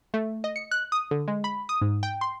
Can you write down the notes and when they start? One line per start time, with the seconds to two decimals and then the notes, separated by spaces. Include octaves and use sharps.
0.14 A3
0.44 D#5
0.56 C#7
0.71 F#6
0.92 D#6
1.11 D3
1.28 G#3
1.44 B5
1.69 D#6
1.82 G#2
2.03 G5
2.21 C6